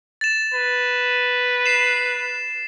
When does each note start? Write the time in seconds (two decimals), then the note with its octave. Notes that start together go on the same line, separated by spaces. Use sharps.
0.21 A6 E7
0.54 B4
1.66 C7 E7